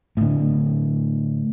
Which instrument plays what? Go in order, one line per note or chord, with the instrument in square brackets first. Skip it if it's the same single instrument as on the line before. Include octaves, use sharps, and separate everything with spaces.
[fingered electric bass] A2 D3